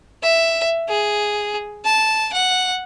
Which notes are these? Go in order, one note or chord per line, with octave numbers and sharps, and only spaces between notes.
E5
G#4
A5
F#5